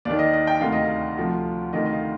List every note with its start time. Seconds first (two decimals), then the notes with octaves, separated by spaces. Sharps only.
0.05 D#2 D#3 D5
0.19 D#5
0.33 D#5
0.47 G5
0.61 D2 C3 D#3 F5
0.72 D#5
0.84 F5
1.17 D2 C3 F3
1.73 D2 C3 D#3 D#5
1.86 D#5
1.93 F5